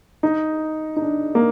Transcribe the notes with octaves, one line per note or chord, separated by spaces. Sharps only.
D#4
D#4
D4
A#3